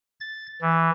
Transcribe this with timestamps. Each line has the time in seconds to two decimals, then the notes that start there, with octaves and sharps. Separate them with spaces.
0.21 A6
0.61 E3